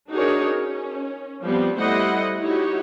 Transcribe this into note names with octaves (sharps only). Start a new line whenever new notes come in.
D4 D#4 F#4 G#4 A#4 C#5
C#4
F3 G3 B3 C4
G3 A3 E4 C5 D#5 F#5
D#4 E4 F#4 G4 C#5